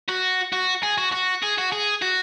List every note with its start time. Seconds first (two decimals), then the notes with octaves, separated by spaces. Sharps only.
0.08 F#4
0.53 F#4
0.83 G#4
0.98 F#4
1.12 F#4
1.43 G#4
1.58 F#4
1.72 G#4
2.02 F#4